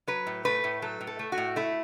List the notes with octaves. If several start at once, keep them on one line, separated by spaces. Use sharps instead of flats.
F#3 B4
A2
A3 B4
A2
F#3 A4
A2
A4
A3
F#4
A2
A3 E4